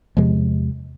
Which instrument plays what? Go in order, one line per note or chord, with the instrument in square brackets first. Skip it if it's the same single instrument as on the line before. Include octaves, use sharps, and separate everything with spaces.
[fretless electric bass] E2 C3 F3 G#3